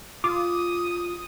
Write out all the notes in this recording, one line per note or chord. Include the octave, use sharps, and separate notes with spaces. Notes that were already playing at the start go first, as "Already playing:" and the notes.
F4 D6 D#6